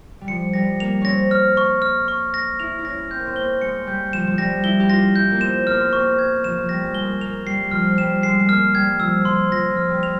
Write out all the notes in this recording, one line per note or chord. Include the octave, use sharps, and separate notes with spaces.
G3
F3 C#7
G3 A#6
A#3 F7
C4 C#4 A#6
F6
C#6
F6
C#6
A#6
E4 F7
E4
C#4 A#6
C4 G6
A#3
C4
A#3 G7
G#3 C#7
G3 G6
F3 E7
F3
G3 A#6
E4 G7
G4
F4 A#6
E4 G6
A#3
C4 E7
A#3 F6
C4
A#3 C#6
G#6
F3 E7
F3
G3 A#6
G#3
G#3 G7
A#3
A#3 F7
G3 C7
F3 F6
G3 E7
G#3 C7
G#3
A#3 F6
G3 G#6
F3 E6
F3 C6
F3 A#6
F3
F6
G3
F7